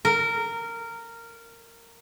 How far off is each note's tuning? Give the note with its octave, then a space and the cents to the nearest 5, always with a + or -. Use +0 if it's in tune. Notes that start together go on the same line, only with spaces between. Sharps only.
A#4 -15